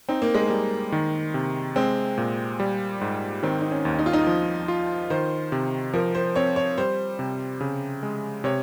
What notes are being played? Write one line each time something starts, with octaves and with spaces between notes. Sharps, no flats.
C4 D#4
A#3
G#3
G3 A#3
D#3
C3
G#3 C4
A#2
G3
G#2
D#3 C4
D#4
C#4
D#2
D#4
F4
D#4
F3
F4
D#3 C5
C3
F3 A#4
C5
C4 C#5
C#5
G3 C5
C3
C#3
G#3
C3 C#5